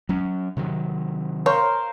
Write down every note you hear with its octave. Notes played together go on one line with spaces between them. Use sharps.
F#3 C#4
C3 D#3 F#3
A#4 C5 C#5 F5